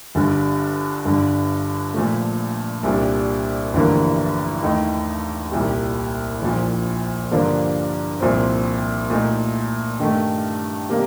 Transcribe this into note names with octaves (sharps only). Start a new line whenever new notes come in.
G1 G2 D3 G3
G1 G2 D3
A#2 F3 A3
C2 A#2 G3 D4
A1 G2 D3 F3 A#3
D#2 D#3 A3 D#4
C2 A#2 G3
A#1 A#2 F3
G2 D3 F3 A#3 D4
C2 A#2 F3 C4
A#2 A3 D#4
G2 D#3 A3
C3 G3 A#3